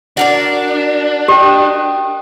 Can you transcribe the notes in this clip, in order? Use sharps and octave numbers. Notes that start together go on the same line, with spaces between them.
D4 F#4 A#4 D5
G4 D#5 G5